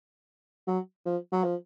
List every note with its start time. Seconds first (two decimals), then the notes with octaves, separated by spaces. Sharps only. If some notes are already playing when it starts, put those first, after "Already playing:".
0.67 F#3
1.06 F3
1.32 F#3
1.44 F3